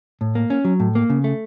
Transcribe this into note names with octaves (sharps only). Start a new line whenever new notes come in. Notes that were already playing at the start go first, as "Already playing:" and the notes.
A2
A#3
C#4
F#3
A2
A#3
C#3
A3